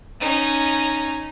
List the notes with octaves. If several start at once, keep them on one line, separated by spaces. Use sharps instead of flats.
C#4 D#4